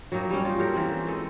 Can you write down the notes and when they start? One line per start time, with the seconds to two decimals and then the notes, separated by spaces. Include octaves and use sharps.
0.12 F#3 G3 A#3 D#4
0.30 G3 C#4
0.45 D#4 F4
0.59 F#4 G4 A4 A#4
0.74 E3 A#3 C4
1.07 G#3 A4